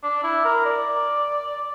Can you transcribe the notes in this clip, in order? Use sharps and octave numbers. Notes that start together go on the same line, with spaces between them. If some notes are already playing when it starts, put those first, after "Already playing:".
D4
E4
A#4
D5